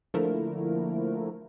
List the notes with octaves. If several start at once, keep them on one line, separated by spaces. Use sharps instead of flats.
D3 F3 A3 A#3 E4 A#4